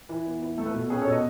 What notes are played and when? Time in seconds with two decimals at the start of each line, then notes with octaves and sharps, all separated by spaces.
0.09 E3
0.25 B3
0.42 E3
0.58 A3 A4
0.66 B4
0.74 B2 A4
0.90 C#4 G#4 B4
1.02 A4 C#5
1.07 B2
1.12 B4 D#5